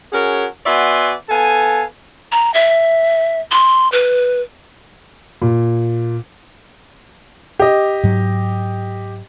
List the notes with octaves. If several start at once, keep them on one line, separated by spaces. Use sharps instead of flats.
C#4 F#4 G#4 A#4 C#5
B3 F#4 D5 E5 G#5 C6
B3 A4 F5 G#5
A#5
E5
C6
B4
A#2
G4 D#5
G#2 F#3